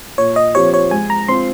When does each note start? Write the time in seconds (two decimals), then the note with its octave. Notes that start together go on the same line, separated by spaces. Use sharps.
0.18 A#2 C#5
0.36 D#5
0.55 F3 C4 G4 C5 C#5
0.74 C#5
0.91 G#3 G#5
1.10 A#5
1.28 C4 F4 C6